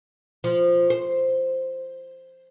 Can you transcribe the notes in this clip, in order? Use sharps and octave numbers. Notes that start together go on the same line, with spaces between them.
F3
C5